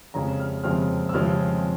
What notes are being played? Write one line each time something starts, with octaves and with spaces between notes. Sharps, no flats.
F2 C#3 F3 G#3 C4 A#5
F6
F2 C#3 F3 G#3 C4 F6
E6
F2 C#3 F3 G#3 C4 F6